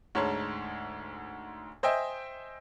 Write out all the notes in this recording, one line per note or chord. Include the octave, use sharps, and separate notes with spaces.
D2 G#2 C#5 A5 C6
C5 D#5 E5 G5 G#5